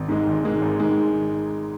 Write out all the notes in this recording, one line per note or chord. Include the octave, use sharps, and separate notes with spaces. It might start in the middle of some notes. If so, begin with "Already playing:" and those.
Already playing: G#1
G#2 D#3 G#3 D#4
G#1
G#2 D#3 G#3 D#4
G#1
G#2 D#3 G#3 D#4